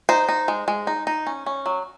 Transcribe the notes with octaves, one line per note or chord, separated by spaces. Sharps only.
D#4 C5
D#4
G#3
G#3
D#4
D#4
C#4
C#4
F#3